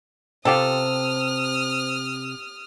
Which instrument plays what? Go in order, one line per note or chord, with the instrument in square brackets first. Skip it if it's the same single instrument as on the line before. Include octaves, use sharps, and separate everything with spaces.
[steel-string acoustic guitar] C3 [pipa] F4 G4 A4 [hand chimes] C5 [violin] D#6 F6